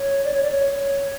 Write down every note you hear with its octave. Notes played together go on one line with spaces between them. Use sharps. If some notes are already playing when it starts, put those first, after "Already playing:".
Already playing: C#5
D5
C#5
D5
C#5